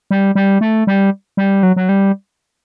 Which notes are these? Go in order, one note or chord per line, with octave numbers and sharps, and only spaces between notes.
G3
G3
A3
G3
G3
F#3
F#3
G3